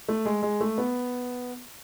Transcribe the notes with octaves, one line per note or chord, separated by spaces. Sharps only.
A3
G#3
G#3
A3
B3